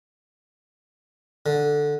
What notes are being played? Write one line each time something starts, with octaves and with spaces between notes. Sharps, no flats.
D3